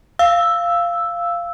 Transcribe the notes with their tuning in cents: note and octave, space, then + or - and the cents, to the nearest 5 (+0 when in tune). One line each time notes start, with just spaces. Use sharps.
F5 -10 E6 +0